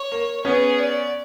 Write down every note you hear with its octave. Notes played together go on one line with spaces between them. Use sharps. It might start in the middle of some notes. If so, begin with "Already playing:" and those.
Already playing: C#5
A#3
B3 C#4 G#4
D5